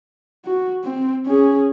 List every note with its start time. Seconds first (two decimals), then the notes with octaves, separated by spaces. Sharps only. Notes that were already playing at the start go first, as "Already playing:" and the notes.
0.45 F#4
0.84 C4
1.26 C#4 G#4